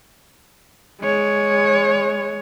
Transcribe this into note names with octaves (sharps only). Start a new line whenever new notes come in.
G#3 C#5